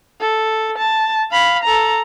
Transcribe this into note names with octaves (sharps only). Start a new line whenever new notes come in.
A4
A5
F5 B5
A4 A#5